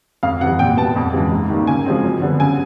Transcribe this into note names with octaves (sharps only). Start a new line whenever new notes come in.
F2 F5
C3 E3 G3 F#5
A#2 G5
G3 B3 A5
F2
C#3 E3 G#3
G#2
D#3 G3 A#3
C#3 G#5
F3 G#3 C4
F#2
D3 G3 B3
C#3 G#5